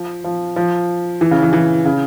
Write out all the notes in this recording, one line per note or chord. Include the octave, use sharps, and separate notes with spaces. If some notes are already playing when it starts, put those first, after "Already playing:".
Already playing: F3
F3
F3
E3
C#3
E3
E3
C#3